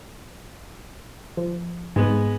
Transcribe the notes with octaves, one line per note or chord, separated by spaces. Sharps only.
F3
G#2 G#3 B3